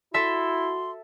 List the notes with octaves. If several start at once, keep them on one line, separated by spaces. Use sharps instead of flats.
E4 F#4 A4 E5 C6